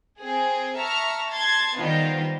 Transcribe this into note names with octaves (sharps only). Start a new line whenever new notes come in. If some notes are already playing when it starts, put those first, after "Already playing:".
C4 G#4
E5 A5 A#5 C#6 F6
A5 C6 G#6 A6
D#3 G3 B3 F4 C5